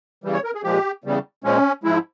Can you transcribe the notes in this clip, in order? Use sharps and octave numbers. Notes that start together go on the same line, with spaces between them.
E2 C#3 E3 G3
C#5
A#4
G#4
A#2 F3 G#3 G4
E2 C#3 G3
A#2 F3 G#3 C#4
G#2 F3 G#3 E4